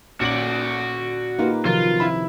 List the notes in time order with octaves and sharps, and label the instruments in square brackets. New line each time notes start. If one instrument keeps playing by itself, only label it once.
[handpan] A#2 C#4 [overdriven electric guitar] F#4 D5 [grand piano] D7 F#7
[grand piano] A#3 F4 [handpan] D#4 G4 B4
[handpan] C3 D#3 F3 [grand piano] F#3 A#4 [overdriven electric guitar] F4
[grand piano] E4 E5 B5